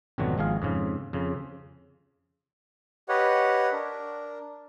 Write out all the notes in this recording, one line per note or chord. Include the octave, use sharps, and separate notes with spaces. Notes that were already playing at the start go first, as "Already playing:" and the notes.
G#1 F2 B2 D3 F#3 F#4
G#1 F3 G#4 F5
F2 G#2 C#3
F2 C#3
G4 B4 C#5 D#5 F#5
D4 A#4